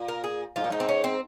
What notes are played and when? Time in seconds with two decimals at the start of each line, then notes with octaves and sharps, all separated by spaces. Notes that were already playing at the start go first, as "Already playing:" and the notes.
Already playing: A#2
0.08 A#4
0.24 G#4
0.56 G#2 F4
0.64 A#2
0.70 G#2 D#4
0.80 C4
0.89 C#4
1.04 C4